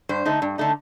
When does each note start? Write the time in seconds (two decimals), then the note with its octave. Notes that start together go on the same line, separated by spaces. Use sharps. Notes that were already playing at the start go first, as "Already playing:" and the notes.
0.09 G2 C5
0.25 D3 A3 D#4
0.42 G2
0.58 D3 A3 D#4